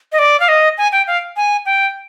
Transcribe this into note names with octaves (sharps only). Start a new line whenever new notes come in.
D#5
D5
F5
D#5
G#5
G5
F5
G#5
G5